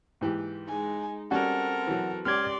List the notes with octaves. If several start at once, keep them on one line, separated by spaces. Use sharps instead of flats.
G#2 E3 G4
G#3 D#4 G#5
G3 C4 C#4 F#4 A4 A#4 F#5
E3 F#3
C#2 G4 D5 C6 F6 G#6